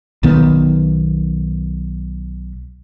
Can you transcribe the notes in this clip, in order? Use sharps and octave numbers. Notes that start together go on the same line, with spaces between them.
B1 D#3 B3